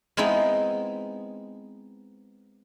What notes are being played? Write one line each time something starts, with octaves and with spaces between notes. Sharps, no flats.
G#3 B3 C4 D#4 E4